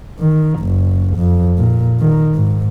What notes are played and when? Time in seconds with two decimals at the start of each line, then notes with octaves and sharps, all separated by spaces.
0.19 D#3
0.60 F#1
1.16 F2
1.58 A#2
2.00 D#3
2.35 G#2